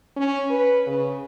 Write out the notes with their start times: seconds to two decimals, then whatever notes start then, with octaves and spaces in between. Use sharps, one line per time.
0.16 C#4
0.51 B4
0.86 C#3